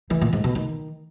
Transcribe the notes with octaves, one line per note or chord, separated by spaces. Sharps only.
E3
A#2
G#2
B2
D#3